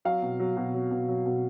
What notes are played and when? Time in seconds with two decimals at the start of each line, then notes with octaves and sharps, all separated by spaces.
0.05 F#3 F5
0.22 B2
0.40 F#3
0.57 B2
0.74 F#3
0.91 B2
1.08 F#3
1.26 B2